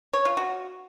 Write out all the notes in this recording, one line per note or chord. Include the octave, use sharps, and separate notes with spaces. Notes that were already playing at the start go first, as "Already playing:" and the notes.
C#5
F4
F#4